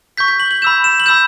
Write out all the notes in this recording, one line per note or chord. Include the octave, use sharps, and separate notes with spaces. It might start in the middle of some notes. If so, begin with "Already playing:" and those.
C#6 G6 B6
B6
F#7
F#7
B5 E6 G6 E7
E7
F#7
B5 E6 G6 E7